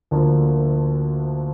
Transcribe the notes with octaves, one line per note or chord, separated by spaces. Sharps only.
D2 D3 F3 A#3